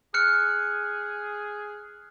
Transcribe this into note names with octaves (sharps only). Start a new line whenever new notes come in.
G#4 F6 F#6 C#7